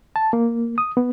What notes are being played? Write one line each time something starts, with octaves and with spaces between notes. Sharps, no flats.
A5
A#3
D#6
B3